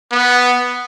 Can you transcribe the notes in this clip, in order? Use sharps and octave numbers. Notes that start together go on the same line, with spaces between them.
B3